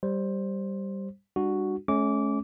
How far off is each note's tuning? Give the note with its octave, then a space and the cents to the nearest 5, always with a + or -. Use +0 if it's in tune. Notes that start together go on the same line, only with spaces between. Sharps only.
G3 +0 C5 +10
G3 +45 D4 +30 F#4 +0
A3 -45 C#4 +0 D6 -20